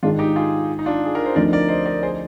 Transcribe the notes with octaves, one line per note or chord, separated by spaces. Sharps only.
G#2 D#3 G#3 D4 F4
D#4 G4
F4 G#4
D#4
D4 F4
G#4
A#4
C5
D2 D3 F3 C4 D#4 A#4 D5
A#4 D5
C5 D#5
A#4 D5
G#4 C5